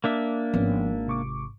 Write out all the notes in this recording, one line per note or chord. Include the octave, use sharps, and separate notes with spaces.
A#3 D4 E5
G#1 F3 B3 C#4
C3 C#6 D6